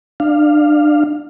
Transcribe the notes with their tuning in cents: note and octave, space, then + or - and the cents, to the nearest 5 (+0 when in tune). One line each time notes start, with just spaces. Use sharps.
D4 +30 F5 +0